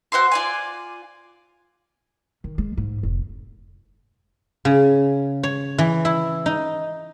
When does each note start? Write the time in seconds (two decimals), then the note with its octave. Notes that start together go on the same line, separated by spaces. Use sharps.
0.12 F#4 C5 E5 C6
0.32 F4 D5 G#5
2.44 D#3
2.58 G#3
2.77 G#2
3.03 F1
4.65 C#3
5.43 C#5
5.78 E3
6.05 E4
6.46 D#4